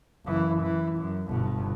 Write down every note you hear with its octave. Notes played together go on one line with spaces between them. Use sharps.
F#1 E3
E3
F#2
G1 B2